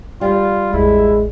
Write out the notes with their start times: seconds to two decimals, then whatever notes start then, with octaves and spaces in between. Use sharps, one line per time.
0.21 G3 F4
0.73 A1 E2 G#3 E4